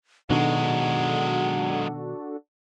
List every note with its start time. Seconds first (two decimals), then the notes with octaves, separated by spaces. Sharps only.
0.30 B2 D#3 F#3 G#3 D4 F#4 A4 F#5